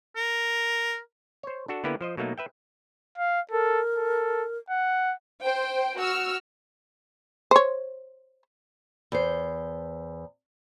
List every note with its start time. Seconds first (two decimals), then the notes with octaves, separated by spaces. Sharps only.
0.16 A#4
1.43 C5 C#5
1.68 D4 F#4 A4
1.84 D3 A#3 B3 E4 G4 B4
2.01 F3 C5 D#5
2.17 B2 F#3 A3 A#3 D#4
2.38 B4 E5 G5
3.18 F5
3.52 A4 A#4
3.96 A4
4.70 F#5
5.43 C5 G5
5.98 F#4 E6 F6
7.51 C5 C#5
9.12 E2 C5